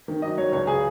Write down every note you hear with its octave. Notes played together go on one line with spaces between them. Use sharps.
D#3
F#3 D#5
F#3 C#5
C#2 C#5
C#3 G#4